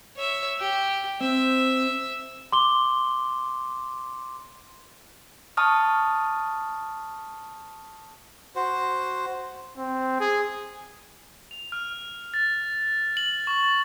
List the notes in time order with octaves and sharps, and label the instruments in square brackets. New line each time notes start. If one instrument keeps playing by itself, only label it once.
[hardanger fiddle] C#5 E5
G4
[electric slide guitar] C4 [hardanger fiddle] E5
[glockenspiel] C6 D6 G7
[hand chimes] A5 C#6 D#6 F6
[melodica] F#4 C5
[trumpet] C4
G#4
[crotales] F7
F6
A6
F#7
C#6
A6